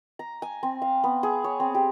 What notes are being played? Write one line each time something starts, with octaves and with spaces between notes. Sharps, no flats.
A#5
G#5
C4
F5
B3
G#4
C#5
C4
G4